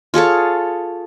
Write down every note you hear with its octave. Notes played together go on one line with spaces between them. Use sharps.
F4 G#4 A4 C#5